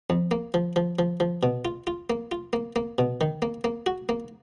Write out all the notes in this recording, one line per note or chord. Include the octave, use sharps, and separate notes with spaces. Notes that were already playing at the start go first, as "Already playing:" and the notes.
F2
A#3
F3
F3
F3
F3
B2
F4
F4
A#3
F4
A#3
A#3
B2
D#3
A#3
A#3
F#4
A#3